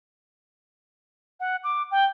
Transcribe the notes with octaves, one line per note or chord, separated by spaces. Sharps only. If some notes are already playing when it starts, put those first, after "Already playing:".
F#5
D6
G5